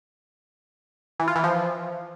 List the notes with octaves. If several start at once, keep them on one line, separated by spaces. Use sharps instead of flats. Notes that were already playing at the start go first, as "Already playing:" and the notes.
E3
F4
E3
F3